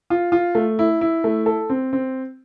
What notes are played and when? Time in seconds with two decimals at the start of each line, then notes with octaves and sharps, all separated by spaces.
0.10 F4
0.32 F4
0.55 A3
0.79 E4
1.01 E4
1.24 A3
1.46 A4
1.70 C4
1.93 C4